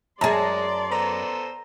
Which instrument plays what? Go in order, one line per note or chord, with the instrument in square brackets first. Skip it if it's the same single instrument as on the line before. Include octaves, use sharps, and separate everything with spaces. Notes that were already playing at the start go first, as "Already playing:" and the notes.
[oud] F#2 G#4 [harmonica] G#3 [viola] D5 C6 [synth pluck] A5 A#5
[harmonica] B3 A4 C5 [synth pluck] A#5